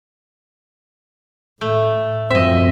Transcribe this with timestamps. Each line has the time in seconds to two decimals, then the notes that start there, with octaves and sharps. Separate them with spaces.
1.61 A2 A3
2.30 F#2 F3 C4 D#5 E5